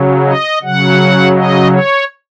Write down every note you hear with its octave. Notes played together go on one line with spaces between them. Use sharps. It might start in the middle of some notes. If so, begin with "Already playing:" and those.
Already playing: C#3 F#3
D#5
C#3 F#3 F#5
D#5
C#5